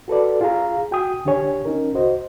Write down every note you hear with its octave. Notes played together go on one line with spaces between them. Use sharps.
F#4 A4 B4 D5
F4 G#4 F5 A#5
F#4 G5 G#5 D#6
C2 D3 D4 G4 C#5 G#5
C#4 D#4 A#4
C#2 F#4 C5 D#5